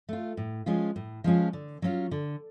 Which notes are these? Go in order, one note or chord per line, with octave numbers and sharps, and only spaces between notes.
A3 F4
A2
F3 G#3 C#4 F4
A2
F3 G#3 C#4 F4
D3
F#3 C#4 F4
D3